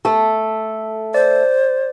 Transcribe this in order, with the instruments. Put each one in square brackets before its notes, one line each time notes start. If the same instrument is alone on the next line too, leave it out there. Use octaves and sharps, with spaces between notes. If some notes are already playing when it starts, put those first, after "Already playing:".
[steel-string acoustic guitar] A3 A4
[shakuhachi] C5 [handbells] D5